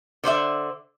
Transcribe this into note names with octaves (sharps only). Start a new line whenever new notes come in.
D3 C5 D5 E5